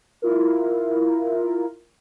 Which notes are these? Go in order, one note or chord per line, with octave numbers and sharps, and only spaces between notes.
E4 F4 A#4